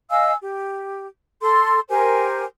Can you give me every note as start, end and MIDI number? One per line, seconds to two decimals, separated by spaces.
0.10 0.33 75
0.10 0.33 77
0.10 0.33 80
0.10 0.33 88
0.41 1.06 67
1.41 1.79 69
1.41 1.79 84
1.89 2.44 67
1.89 2.44 70
1.89 2.44 72
1.89 2.44 80